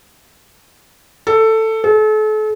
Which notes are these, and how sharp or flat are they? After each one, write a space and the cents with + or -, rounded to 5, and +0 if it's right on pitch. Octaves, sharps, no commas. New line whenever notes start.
A4 +10
A4 -40